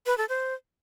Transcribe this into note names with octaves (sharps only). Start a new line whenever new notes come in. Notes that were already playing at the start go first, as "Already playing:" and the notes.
B4
A4
C5